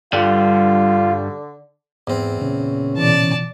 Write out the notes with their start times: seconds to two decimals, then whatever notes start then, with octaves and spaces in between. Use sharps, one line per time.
0.13 G2 D3 G3 F4
2.07 E2 G#2 C4
2.41 A#2 C#3 C#4
2.97 B2 E3 D5 A5